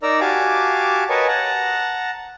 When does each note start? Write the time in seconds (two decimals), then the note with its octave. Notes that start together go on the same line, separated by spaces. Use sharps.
0.03 D#4 A#4 D5 A#5 E6
0.20 F#4 G4 F5 G#5 A5 D6
1.09 A#4 B4 C#5 D#5 G#5 A5
1.28 F#5 A5 A#5